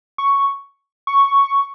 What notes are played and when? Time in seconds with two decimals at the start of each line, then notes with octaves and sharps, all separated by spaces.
0.18 C#6
1.07 C#6